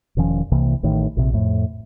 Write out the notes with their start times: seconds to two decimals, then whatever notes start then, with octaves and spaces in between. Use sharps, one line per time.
0.17 E1 D#3 F3 C#4
0.52 C2 C3 E3 A#3
0.83 A1 A2 D#3
1.17 A#1 C3
1.34 F2 A2